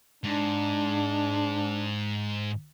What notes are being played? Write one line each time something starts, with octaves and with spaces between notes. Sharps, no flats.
G#2 D4